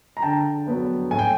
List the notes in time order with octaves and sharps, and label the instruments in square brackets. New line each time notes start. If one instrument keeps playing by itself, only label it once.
[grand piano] A#5
D3 G5 A5
F#3 B3 D4
A2 G#5
G5